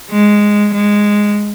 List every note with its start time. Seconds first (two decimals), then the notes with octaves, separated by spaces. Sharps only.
0.11 G#3
0.73 G#3